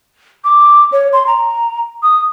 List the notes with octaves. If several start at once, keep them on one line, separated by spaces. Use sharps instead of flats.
D6
C#5
C6
A#5
D#6